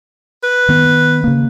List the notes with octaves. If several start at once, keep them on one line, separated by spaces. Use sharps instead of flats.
B4
D#3 B3
C#3 A#3